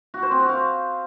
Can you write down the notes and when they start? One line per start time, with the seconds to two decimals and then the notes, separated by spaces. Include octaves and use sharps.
0.14 F#4
0.22 C5
0.31 C4
0.40 F#4
0.49 F5